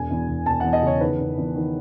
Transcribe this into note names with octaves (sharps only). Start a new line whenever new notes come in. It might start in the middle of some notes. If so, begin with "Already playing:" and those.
Already playing: E1 G#5
E2
E1
E1 A5
E2 F#5
D#5
C#3 C#5
D#3 B4
E2
E2
D#3